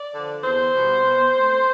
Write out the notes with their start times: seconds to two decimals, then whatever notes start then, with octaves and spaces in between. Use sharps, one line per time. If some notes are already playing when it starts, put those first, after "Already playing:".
Already playing: D5
0.13 D3 F3
0.43 E2 C5
0.74 B2 G3 B3
1.04 B2
1.34 A3 C4